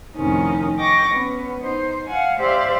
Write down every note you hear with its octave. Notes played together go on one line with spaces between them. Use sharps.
F2 A2 C3 D#3 C#4 D#4
D#5 G5 C#6 D6 A#6
B3 C#4 B4
D#4 C5
F5 F#5 G#5
G4 C5 D5 E5 F5